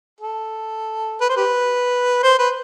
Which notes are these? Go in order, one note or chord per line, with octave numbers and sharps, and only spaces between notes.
A4
B4
C5
G4 B4
C5
B4